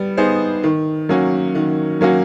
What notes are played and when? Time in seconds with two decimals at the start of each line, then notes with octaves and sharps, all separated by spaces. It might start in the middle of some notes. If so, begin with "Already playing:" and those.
Already playing: G3 B3
0.17 B3 D#4 G#4 C5
0.63 D#3
1.09 F#3 A#3 C#4 F#4
1.55 D#3
2.01 F#3 A#3 C#4 F#4